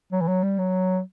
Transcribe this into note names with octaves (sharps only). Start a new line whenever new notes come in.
F#3
E3
F#3
G3
F#3